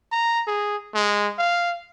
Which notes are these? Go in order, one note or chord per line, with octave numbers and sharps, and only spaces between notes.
A#5
G#4
G#3
F5